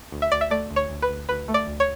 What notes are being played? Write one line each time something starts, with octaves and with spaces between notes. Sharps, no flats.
D2
E5
D2 D5
E5
A3 D5
D2
C#5
D2
B4
D2
D2 B4
A3
D5
D2
C#5